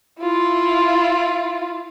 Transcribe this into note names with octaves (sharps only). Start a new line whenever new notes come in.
E4 F4